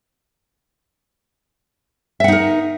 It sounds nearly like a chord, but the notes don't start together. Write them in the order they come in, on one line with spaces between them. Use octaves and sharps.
E5 F#5 D#4 A#4